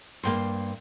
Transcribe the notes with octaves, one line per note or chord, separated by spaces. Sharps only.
G2 A#3 C5 G5 C6